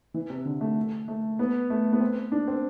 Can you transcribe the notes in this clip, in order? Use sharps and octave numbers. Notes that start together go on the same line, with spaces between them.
E3
C3
D3
A3
A3
B3
A3
B3
C4
D4
C4